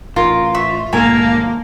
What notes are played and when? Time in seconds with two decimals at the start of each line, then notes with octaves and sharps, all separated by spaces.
0.16 A1 F4 A#4
0.54 E5 C#6
0.92 B1 G#2 D#3 A#3 A4 A#4 G#5